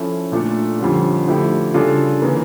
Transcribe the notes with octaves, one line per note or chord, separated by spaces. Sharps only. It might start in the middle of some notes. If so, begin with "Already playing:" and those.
Already playing: F3 C#4 E4 A4
A#2 A3 D4 F4 A4
F2 D3 G3 C#4 F4
D3 F3 A3 E4 G4
C#3 G3 D4 F4 A4
C#3 E3 A#3